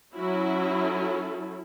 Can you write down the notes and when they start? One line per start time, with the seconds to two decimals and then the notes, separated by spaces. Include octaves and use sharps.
0.15 F#3 C#4 E4 F#4
0.86 A4